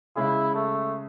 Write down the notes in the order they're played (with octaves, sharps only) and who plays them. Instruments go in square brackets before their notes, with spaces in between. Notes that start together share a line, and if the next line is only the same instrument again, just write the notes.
[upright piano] C#3 G#3 C#4 G#4 [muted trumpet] E4
[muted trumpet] A3